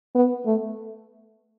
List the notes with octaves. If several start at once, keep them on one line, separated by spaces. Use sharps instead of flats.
B3
A3